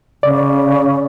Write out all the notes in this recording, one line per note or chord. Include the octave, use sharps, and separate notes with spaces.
C#3 D5